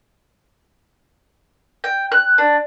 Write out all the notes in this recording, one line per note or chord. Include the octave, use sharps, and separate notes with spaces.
G5
F#6
D4